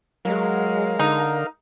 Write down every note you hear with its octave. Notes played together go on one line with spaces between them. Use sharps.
F#3 G#3 A#4 F5
D3 D#4